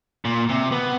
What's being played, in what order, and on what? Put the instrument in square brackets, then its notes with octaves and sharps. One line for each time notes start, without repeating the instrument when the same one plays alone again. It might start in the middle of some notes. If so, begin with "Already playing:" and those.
[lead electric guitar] A#2
C3
B3